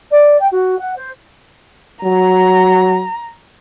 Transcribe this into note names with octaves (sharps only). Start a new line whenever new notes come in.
D5
G5
F#4
F#5
C5
F#3 A#5